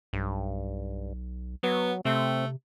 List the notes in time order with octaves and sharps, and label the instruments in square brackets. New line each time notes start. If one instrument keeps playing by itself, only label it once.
[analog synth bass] B1 [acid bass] G2
[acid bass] F#3 [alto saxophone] B3
[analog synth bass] C3 [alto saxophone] A3 [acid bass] C4